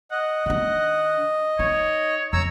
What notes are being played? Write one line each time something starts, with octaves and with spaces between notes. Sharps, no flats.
D#5 F#5
D#3 D4 F#5
D#4 C#5
F2 C#5 A#5 E6